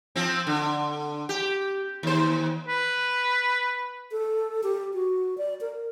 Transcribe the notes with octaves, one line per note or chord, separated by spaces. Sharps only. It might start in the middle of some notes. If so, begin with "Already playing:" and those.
F3 C4
D3
G4
D#2 C5
B4
A4
G4
F#4
D5
A#4